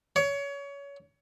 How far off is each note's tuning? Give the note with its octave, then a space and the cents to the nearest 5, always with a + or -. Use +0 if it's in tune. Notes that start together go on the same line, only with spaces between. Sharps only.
C#5 +25